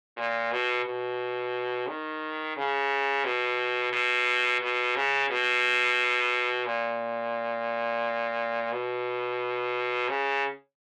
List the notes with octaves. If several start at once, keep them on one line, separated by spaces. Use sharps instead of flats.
A#2
B2
B2
D#3
C#3
B2
B2
B2
C#3
B2
A#2
B2
C#3